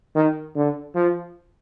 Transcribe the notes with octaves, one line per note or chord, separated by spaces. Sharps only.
D#3
D3
F3